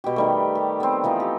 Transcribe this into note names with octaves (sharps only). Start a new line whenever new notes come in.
B2 G4
D#3 G3 A3
G4
B3 C4
E3 F3 D#4
G4